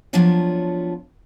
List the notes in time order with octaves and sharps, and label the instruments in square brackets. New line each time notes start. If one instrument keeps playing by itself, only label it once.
[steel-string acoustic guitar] F3 F#3 B3 D4 F4 C#5